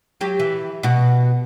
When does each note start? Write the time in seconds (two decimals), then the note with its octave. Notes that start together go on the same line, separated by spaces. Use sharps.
0.21 F#3 G4
0.39 E3
0.83 B2 F#4